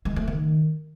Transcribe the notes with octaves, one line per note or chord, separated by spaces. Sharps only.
G#3
A3
D#3